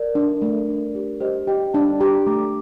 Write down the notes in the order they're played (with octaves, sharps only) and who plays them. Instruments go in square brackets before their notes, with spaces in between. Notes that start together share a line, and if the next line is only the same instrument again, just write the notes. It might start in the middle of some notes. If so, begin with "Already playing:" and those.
Already playing: [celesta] A#4 D5
[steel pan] D4
A3
D4
G4
[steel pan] G4 [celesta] C5 D#5
[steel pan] G4 [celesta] D#5 G5
[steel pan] D4 [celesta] F5 A5
[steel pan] G4 [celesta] G5 A#5
[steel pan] A3 [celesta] A#5 D6